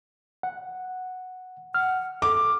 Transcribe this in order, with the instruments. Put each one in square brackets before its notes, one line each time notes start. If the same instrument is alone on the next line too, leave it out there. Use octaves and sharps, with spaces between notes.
[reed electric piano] F#5
[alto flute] F#5 [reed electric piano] F6
[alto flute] A4 [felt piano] D6